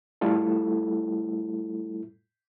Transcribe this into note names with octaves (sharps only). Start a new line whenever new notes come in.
G3 A3 E4 F4 A4